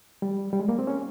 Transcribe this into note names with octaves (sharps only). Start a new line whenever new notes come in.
G3
G3
G#3
A#3
C4
C#4